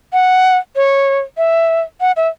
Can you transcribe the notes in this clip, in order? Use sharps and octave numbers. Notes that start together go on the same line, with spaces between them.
F#5
C#5
E5
F#5
E5